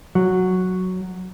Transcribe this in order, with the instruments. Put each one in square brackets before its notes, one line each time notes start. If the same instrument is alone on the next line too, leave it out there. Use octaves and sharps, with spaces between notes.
[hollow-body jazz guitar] F#3